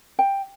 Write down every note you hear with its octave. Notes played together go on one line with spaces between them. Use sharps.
G5